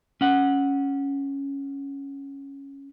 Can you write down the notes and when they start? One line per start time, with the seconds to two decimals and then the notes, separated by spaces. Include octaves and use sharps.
0.21 C#4 F#5